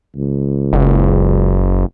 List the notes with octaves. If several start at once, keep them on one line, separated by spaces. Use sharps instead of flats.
C#2
F#1